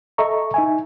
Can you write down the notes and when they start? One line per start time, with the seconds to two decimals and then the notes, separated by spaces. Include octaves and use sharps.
0.18 A4 D#5 E5 A#5 C#6
0.54 D#4 E5 G#5